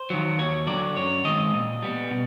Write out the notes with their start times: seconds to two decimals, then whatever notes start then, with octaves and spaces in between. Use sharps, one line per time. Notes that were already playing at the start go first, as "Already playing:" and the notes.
Already playing: C5
0.10 D#3 F#3
0.38 D#2 C#5
0.67 D3 F#3 D5
0.96 F#2 C#5
1.25 D#3 G#3 C4 D#5
1.54 A#2
1.82 G3 B3
2.11 B2